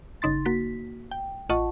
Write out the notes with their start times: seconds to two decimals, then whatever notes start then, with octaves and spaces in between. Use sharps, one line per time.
0.22 G1 C#3 D#4 C6 A6
0.45 A#3 F#4 B6
1.11 G5
1.49 A1 F4 D#5 F#5 A5 C#6